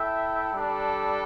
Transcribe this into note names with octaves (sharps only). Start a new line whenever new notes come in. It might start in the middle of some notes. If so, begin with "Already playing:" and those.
Already playing: E4 A4 E5 G5
G3 D4 A4